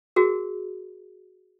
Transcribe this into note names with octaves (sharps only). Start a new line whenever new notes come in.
F#4 G#4 A#4